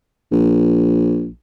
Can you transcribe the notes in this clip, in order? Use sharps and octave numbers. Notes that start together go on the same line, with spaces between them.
A#1